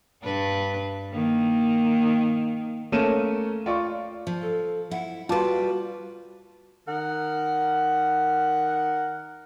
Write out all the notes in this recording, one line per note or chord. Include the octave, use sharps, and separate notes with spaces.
G2 D4 B4
D#3 A#3
A3 A#3 C#4 A#4 D#7 E7
F4 D5 C#6
F3
A4
E4 F#5
G3 F4 F#4 B4 A5 D6
D#3 A#4 F#5